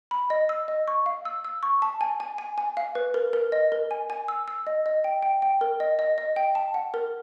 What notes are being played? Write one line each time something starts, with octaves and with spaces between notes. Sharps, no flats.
B5
D#5
E6
D#5
C#6
F5
E6
E6
C#6
A5
G#5
G#5
G#5
G#5
F5
B4
A#4
A#4
D#5
A#4
G#5
G#5
E6
E6
D#5
D#5
G5
G5
G5
A#4
D#5
D#5
D#5
G5
A5
F#5
A#4